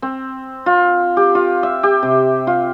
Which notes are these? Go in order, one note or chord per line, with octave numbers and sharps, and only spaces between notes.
C4
F4
G4
F4
E5
G4
C3
F4